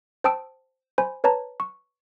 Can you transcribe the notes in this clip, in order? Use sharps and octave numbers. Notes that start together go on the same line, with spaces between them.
C5 G5 A5 D#6 E6 D7
C5 G#5 B5
B4 C#5 A5 A#5
C#6